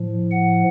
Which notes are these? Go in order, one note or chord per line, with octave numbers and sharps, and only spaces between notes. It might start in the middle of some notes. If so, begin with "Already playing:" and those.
Already playing: A2 F3
F#5